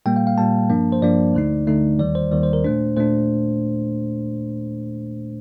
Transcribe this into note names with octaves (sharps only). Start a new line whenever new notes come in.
A#2 G3 A#3 G5
F5
F5
A#2 G3 A#3 A5
G2 F3 A#3 D4
C5
G2 F3 A#3 D4 D5
D2 D3 A3 D#4
D2 D3 A3 D#4
D#2 D#3 G3 D5
C5
D#2 D#3 G3 D5
C5
A#4
A#2 A3 D4 C5
A#2 A3 D4 C5